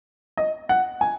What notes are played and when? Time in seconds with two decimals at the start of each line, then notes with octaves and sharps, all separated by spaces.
0.37 D#5
0.69 F#5
1.01 G#5